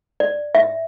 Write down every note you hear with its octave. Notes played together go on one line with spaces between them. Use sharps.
D5
E5